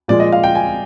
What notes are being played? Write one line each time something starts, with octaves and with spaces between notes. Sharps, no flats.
A#2 F3 G#3 D5
D#5
F5
G5
G#5